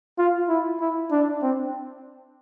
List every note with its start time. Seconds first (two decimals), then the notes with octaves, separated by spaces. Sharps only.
0.18 F4
0.49 E4
0.80 E4
1.11 D4
1.42 C4